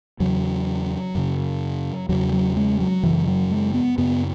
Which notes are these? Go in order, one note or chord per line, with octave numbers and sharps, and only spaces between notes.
E2 C#3 F#3
F#2 C#3
E2 C#3 F#3
F#3
G#3
F#3
F#2 C#3 E3
F#3
G#3
B3
F#2 C#3 B3